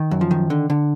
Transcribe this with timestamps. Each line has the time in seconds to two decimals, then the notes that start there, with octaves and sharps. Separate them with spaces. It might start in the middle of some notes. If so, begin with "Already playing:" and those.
Already playing: D#3
0.11 F#2
0.21 F3
0.31 D#3
0.50 D3
0.70 D3